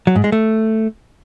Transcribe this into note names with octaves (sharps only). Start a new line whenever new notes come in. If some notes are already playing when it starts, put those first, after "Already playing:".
F#3
G#2
G#3
A3